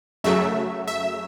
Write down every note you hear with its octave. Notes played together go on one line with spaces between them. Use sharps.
F#2 C#3 F#3 A3 E5
E5